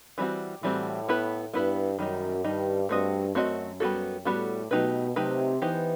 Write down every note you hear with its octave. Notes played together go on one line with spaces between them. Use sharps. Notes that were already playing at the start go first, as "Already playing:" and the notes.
E3 G3 C4 F#4
A2 E3 G3 C4 F#4
B3 E4 B4
G2 B3 E4 B4
F#2 D#3 G3 D#4
G2 D#3 G3 D#4
G2 A3 C4 F#4 B4 D#5
F#2 A3 C4 F#4 B4 D#5
G3 B3 F#4 A4
A2 G3 B3 F#4 A4
B2 F#3 A3 D#4 G4 B4
C3 F#3 A3 D#4 G4 B4
E3 B3 D#4 G4 C5